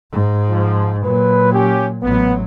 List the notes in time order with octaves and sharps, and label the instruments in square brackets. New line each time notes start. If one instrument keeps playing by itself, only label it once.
[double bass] G#2
[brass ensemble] F3
[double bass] A#2 F#3 [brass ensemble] B4
[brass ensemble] C#4 G4
[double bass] A1 F#3 [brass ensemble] B3